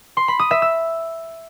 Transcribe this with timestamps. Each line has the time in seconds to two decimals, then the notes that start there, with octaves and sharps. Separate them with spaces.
0.17 C6
0.28 B5
0.39 D#6
0.51 E5
0.62 E6